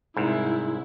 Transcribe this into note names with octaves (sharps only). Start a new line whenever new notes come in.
C2 G#2 E4